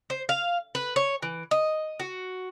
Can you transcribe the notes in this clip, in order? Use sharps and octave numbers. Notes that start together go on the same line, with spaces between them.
C5
F5
B4
C#5
E3
D#5
F#4